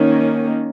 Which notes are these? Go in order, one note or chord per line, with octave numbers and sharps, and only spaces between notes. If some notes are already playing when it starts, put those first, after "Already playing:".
Already playing: D#3 A#3 C#4